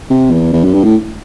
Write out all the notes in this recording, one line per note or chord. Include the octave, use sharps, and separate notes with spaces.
C3
E2
E2
F#2
G2
A2